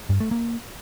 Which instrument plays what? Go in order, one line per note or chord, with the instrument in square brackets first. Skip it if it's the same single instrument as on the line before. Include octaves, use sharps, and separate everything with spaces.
[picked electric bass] G2
A3
A#3